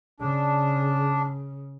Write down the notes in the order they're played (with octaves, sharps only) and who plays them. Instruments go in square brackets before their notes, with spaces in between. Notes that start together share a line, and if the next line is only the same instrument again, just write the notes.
[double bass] C#3 [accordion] D4